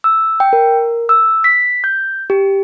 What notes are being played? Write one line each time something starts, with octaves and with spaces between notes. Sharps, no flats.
E6
G5
A#4
E6
B6
G6
G4